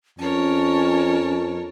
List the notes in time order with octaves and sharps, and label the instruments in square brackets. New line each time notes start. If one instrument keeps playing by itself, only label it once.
[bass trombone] F2 [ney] C#4 [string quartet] A#4 C#5 A5